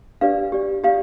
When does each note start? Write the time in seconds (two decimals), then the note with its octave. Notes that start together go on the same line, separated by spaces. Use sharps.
0.21 D4 G4 B4 D5 F5
0.52 G4 D5
0.84 G4 D5 F5